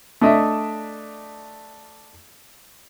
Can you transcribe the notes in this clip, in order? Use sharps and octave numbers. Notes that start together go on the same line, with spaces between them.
A3 D4 D#5 E5